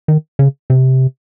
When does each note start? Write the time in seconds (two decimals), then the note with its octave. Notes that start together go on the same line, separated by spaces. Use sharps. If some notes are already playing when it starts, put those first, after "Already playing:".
0.08 D#3
0.39 C#3
0.70 C3